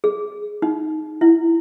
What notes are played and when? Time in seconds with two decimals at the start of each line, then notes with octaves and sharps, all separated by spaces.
0.04 G#4
0.62 D#4
1.21 E4